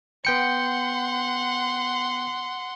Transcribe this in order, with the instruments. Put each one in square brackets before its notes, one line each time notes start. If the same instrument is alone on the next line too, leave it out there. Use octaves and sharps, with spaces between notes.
[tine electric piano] B3 G5 C#7 [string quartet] F#5 C6